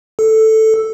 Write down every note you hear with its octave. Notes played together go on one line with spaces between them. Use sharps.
A4